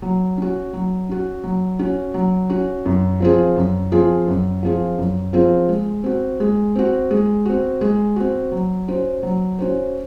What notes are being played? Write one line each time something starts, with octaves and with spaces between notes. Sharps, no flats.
F#3
C#4 F#4
F#3
C#4 F#4
F#3
C#4 F#4
F#3
C#4 F#4
F#2
F3 C4 F4 G#4
F#2
F3 C4 F4 G#4
F#2
F3 C4 F4 G#4
F#2
F3 C4 F4 G#4
G#3
C4 F#4
G#3
C4 F#4
G#3
C4 F#4
G#3
C4 F#4
F#3
C#4 F#4 C5
F#3
C#4 F#4 C5